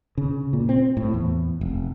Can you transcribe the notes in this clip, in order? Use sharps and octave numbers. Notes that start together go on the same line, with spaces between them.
C#3
A#2
C4
A2
E2
F1